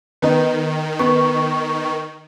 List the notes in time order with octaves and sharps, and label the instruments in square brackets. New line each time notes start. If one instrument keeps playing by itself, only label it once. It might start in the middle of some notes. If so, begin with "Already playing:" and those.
[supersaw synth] D#3 [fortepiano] B3 D#4
[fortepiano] B3 [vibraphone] C#6